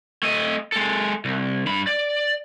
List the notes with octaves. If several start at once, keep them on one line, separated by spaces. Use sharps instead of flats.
A3 D#5
G#3 A4
C2
G2 B5
D5